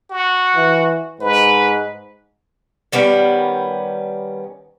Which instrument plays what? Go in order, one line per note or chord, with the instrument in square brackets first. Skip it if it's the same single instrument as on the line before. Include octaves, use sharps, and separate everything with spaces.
[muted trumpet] F#4
[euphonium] E3
[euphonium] G#2 [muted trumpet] B4
[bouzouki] D#3 G3 B3 C#4